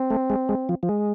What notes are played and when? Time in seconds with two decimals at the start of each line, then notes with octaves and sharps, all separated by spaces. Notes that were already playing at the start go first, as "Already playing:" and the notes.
Already playing: C4
0.10 A3
0.30 G#3
0.49 G#3
0.69 F3
0.83 F3
0.89 G#3